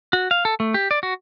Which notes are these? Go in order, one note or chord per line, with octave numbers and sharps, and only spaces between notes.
F#4
F5
A4
A3
G4
D5
F#4